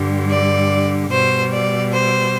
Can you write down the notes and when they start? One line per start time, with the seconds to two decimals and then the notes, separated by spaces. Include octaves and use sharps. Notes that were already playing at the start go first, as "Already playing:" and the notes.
Already playing: G2 D3 G3
0.30 D5
1.11 B2 G3 C5
1.52 D5
1.92 C5